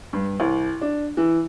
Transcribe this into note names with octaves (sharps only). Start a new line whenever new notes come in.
G2
C2
D4
E3